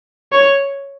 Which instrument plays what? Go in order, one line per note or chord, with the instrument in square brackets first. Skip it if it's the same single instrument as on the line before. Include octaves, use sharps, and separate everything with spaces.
[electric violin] C#5